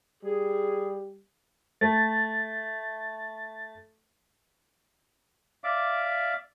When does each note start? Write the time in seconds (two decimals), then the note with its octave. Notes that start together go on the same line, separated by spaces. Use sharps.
0.23 G3 G#4
1.81 A3 A6
5.64 D5 E5 F5 D6